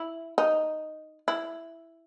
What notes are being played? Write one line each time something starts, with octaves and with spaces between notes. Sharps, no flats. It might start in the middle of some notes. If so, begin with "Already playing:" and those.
Already playing: E4
D#4
E4